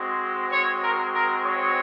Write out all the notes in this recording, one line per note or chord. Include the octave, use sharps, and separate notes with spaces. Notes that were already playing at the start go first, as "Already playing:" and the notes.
Already playing: G#3 C4 F#4
C#5
A#4
A#4
C#5